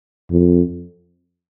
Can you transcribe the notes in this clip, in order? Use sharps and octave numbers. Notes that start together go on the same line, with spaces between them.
F2